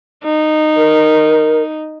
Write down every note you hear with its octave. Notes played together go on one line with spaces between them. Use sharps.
D#4
A#4